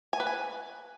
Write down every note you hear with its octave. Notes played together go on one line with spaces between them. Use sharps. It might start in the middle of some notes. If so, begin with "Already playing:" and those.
G#5
B4
G#5